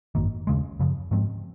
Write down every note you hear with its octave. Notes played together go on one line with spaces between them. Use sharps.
G#1 F#2 D#3 A#3
D#2 C#3 G#3
F#2 C#3 F3
G#2 F3 G#3 C4